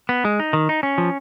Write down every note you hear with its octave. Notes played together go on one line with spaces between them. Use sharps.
B3
G#3
D#4
D#3
D#4
C#4
F3